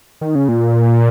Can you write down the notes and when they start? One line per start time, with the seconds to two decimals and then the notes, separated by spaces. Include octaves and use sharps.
0.21 D#3
0.35 C#3
0.48 A#2